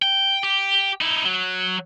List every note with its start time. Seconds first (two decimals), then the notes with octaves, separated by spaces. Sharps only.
0.02 G5
0.43 G4
1.01 D#4 E4
1.25 F#3